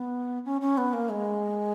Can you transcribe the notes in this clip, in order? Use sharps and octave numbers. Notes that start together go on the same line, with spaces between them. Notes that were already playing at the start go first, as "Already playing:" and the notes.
Already playing: B3
C#4
C#4
B3
A#3
G#3